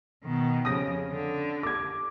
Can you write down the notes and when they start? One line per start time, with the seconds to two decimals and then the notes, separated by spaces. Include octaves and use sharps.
0.24 B2 D#3
0.65 F2 C#3 D#6 A#6
1.12 D3
1.63 D6 G#6